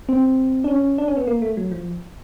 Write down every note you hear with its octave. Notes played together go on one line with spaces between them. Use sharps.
C4
D4
C#4
D4
C#4
B3
A#3
A3
F#3
F3